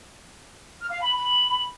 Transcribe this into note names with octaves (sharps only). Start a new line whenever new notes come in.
F6
F5
B5
B5